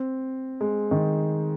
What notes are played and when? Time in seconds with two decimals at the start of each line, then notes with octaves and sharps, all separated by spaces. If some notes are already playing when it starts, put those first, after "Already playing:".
Already playing: C4
0.61 G#3
0.91 D#3